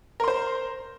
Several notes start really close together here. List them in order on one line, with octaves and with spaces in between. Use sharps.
A#4 C6 C5